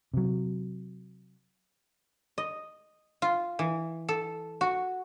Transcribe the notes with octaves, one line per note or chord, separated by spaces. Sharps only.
C3 F#3
D#5
F4
E3
A4
F#4